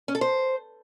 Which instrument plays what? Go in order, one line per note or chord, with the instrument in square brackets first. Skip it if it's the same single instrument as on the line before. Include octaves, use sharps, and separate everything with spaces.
[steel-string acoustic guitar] C#4
A4
C5